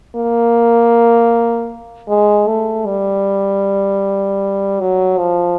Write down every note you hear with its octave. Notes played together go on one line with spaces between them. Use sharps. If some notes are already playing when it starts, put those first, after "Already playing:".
A#3
G#3
A3
G3
F#3
F3